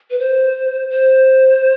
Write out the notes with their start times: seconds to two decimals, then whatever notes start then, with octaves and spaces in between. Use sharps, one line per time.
0.10 B4
0.19 C5
0.90 C5